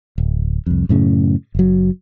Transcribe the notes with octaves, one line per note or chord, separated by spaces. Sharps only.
D1
C2 F2
F#2 A2 C#3
F#1 F#3